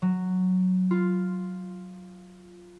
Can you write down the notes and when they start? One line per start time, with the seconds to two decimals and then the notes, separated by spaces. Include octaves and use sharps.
0.02 F#3
0.91 F4